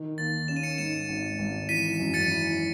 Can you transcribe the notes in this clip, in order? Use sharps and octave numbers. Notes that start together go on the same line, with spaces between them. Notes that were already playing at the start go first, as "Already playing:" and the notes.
Already playing: D#3
D#2 A6
C#4 E7
D#7
C#7 E7
G#2 C#7 E7
G#1
G#1
E3 B6 D#7
F#2
A6 C#7
E4